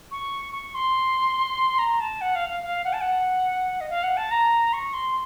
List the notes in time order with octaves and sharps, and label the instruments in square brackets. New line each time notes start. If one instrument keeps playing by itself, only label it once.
[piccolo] C#6
C#6
C6
A#5
A5
F#5
F5
F5
F5
F#5
A5
F#5
D#5
F5
F#5
A5
A#5
C#6
C6